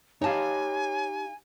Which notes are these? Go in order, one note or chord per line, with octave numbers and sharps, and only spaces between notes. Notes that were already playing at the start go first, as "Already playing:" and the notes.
D#4 G4 C#5 F5 G#5 A5